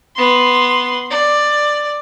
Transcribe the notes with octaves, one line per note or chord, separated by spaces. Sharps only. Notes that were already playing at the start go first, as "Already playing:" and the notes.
B3 C6
D5